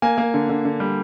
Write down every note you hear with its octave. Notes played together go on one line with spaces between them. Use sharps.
A#3 G#5
A#3
D3
D3
D3
G3